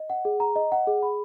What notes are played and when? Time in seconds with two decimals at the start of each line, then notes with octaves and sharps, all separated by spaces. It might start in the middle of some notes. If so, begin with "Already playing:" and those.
Already playing: D#5
0.10 F#5
0.25 G#4
0.40 A#5
0.56 D#5
0.72 F#5
0.87 G#4
1.03 B5